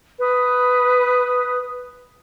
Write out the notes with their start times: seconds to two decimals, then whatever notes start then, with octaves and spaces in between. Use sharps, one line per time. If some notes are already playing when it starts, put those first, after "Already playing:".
0.20 B4 D#6